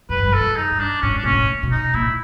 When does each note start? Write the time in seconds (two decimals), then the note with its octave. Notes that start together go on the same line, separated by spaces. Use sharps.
0.09 F#2 B4
0.18 G2
0.28 F#2
0.33 A4
0.41 F#2
0.56 D#4
0.71 G2
0.80 D4
1.02 G#2 C#4
1.17 D4
1.23 A#2 C#4
1.33 A2
1.63 B2
1.72 D#4
1.94 A#2 E4